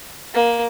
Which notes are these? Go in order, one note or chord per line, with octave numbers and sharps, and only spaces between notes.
A#3